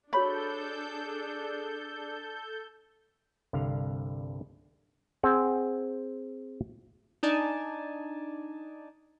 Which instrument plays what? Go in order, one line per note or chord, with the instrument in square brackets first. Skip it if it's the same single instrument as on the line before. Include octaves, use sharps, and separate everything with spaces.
[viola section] D4 G#4 [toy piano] F#4 C#5 C#6 [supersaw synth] A4 G6 [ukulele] B5
[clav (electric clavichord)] C2 G2 D3 F5
C4 G#4 F#5
[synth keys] D4 D#4 D5 G#5 A5